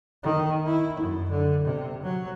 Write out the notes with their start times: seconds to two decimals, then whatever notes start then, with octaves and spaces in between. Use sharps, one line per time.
0.23 D#3
0.65 E4
1.00 F#2
1.31 D3
1.65 C3
2.03 F#3